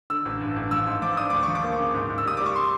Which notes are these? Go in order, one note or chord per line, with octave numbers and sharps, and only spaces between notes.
D3 E6
A1
G2
A1
F3 E6
G#2
F3 D6
D4 D#6
D2 D6
C#6
F3
D6
A#3
C#3
G#2
G#2
E6
G3 D#6
G3 D6
C#6
C6